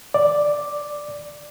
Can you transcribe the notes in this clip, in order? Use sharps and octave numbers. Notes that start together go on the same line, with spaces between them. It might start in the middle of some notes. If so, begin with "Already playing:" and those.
D5